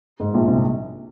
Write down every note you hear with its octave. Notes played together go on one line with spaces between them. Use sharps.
G#2
A#1 A#2
C2 C3